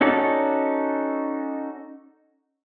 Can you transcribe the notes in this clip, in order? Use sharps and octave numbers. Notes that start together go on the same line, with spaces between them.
C#4 D#4 F#4 A4 D5